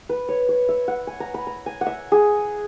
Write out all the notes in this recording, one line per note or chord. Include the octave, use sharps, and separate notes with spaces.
B4
C#5
C#5
E5
F#5
G#5
A#5
B5
A#5
G#5
F#5
E5
G#4